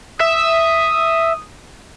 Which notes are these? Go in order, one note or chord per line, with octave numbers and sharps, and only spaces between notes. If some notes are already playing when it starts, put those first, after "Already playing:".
E5 D#6